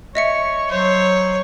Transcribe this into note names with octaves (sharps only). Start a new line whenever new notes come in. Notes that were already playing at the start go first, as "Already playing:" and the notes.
C#5 D#5 E5 C#7
F#3 C5 C#5